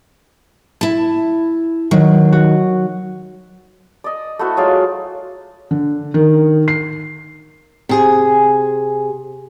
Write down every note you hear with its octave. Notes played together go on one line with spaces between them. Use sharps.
E4 A5
D#3 F#3
F#4
D5 D#5
A3 E4 F#4 C5
F#3 G#3 F4 D5
D3
D#3
C7
C3 G#4 G#5